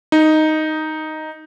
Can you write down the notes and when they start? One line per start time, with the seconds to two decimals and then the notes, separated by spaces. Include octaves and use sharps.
0.12 D#4